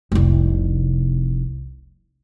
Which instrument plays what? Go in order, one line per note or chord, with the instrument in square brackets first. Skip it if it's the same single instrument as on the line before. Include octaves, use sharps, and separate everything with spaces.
[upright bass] F1 C2